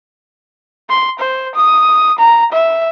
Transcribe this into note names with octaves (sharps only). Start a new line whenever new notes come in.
C6
C5
D#6
A#5
E5